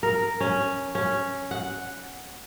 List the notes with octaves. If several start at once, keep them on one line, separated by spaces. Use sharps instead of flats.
A#4
C#4
C#4
F#5